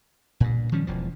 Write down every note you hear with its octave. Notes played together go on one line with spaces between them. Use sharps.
G2 A#2
D#3 F3 G3 C#4
E1 E2 F3